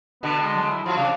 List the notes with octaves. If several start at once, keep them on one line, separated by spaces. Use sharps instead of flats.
B2 D3 B3
G#3
F#3 A5
E4
F3 F#3 F4 F#4
C3 D4 F5